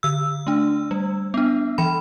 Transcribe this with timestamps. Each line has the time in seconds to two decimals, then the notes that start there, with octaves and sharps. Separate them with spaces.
0.03 D3 E6
0.47 A3 D4
0.91 G3
1.34 B3 D4
1.78 E3 B5